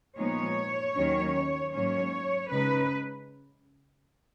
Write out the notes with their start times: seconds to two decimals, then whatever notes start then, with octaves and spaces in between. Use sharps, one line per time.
0.18 A#2 F3 G#3 B3 D#4 C#5
0.96 D#2 D#3 F#3 C#4
1.73 G#2 F#3 A#3 C#4 C#5
2.51 C#3 G#3 D#4 B4